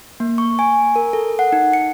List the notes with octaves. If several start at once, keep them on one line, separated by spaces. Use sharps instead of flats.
A#3
C#6
G#5
A#4
A4
F#5
D#4
C#7